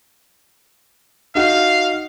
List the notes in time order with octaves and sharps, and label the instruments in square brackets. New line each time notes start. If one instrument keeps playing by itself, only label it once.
[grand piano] D#4 F#4 [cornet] F5